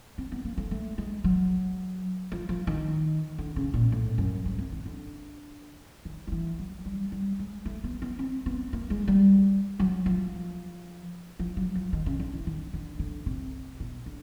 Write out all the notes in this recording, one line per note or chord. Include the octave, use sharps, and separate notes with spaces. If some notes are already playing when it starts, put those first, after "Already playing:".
C4
B3
A#3
A3
A3
G#3
F#3
F3
F3
D#3
D3
C#3
A#2
A2
F#2
G#2
C3
D#3
D3
D#3
F3
E3
F#3
G3
G3
G#3
A3
B3
B3
C4
B3
A#3
G#3
G3
F#3
F3
F3
F#3
F3
D#3
C#3
D3
E3
D#3
D3
D3
C3
B2
D3